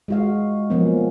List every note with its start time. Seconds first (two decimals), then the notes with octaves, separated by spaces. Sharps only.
0.08 G#3 F#4 F5
0.70 F3 F#3 A#3 B3 C#4